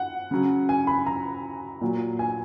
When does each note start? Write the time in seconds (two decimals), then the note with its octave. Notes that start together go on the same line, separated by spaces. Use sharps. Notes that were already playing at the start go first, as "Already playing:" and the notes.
Already playing: F#5
0.31 C#3 F#3
0.69 G#5
0.87 B5
1.06 A#5
1.81 A#2 F#3
2.19 G#5